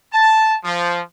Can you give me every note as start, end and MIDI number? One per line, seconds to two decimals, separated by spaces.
0.13 0.55 81
0.64 1.00 53